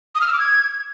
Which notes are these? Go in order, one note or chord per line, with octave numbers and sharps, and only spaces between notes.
D#6
F6
E6
D6
G#6